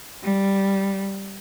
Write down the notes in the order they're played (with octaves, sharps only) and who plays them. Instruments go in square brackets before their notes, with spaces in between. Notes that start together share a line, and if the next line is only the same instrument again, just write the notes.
[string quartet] G3